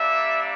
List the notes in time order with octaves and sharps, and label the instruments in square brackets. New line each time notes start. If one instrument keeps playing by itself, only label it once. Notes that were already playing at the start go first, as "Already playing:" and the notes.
Already playing: [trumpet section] G3 A#3 D4 E5